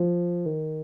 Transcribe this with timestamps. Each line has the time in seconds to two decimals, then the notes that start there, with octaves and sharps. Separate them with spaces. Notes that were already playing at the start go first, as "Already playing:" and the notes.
Already playing: F3
0.46 D#3